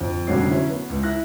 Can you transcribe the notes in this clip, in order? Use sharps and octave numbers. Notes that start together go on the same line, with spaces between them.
F2
F1 B2 D3 G3 C#4 C7
F#3 C#4 E4
B3
C#2
E4 F#6 A#6